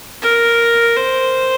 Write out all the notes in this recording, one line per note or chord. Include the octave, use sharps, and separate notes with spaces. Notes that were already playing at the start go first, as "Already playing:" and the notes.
A#4
C5